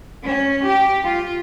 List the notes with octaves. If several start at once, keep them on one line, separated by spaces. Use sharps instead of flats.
C#4
G4
F4